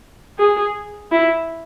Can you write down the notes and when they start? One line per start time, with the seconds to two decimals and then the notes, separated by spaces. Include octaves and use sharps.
0.38 G#4
1.11 E4